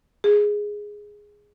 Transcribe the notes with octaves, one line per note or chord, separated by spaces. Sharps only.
G#4